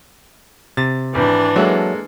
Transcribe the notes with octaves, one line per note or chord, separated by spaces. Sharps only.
C3 A6
G#1 E3 D4
F#3 G#3 A#3 A4 E5 F#5